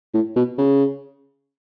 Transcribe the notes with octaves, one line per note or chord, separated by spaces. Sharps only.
A2
B2
C#3